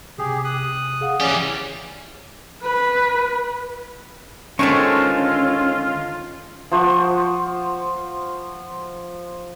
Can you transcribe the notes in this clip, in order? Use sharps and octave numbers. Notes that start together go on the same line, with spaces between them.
C3 G4 G#4
D#6 F#6
G#4 F5 F#5
E3 C#4 G4 G#4 D5 C7
B4
D3 D#3 G#3 A3 C#4 F4 C5 C#6
F3 C5 F#5 C#6